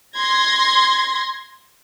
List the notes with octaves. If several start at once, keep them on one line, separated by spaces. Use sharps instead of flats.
C6 G#6 A#6